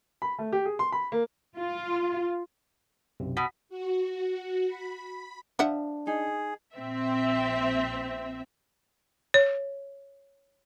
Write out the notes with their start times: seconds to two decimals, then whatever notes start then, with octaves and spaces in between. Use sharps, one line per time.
0.22 B5
0.39 A3
0.52 G4
0.66 G#4
0.79 C6
0.92 B5
1.12 A#3
1.56 F4
3.20 B1 F#2 C3
3.37 B2 B6
3.69 F#4
4.67 B5
5.59 F3 D4 E5 F#5
6.07 D#4 G#4
6.75 A#1 C4 E5
9.34 C#5